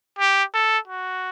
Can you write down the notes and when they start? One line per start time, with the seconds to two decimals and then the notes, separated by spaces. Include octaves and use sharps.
0.19 G4
0.54 A4
0.88 F#4